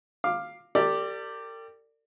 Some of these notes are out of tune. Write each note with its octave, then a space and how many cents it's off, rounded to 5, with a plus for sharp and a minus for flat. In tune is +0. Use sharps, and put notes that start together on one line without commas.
F5 +0 D6 +15
G4 +0 A#4 -45 D5 +0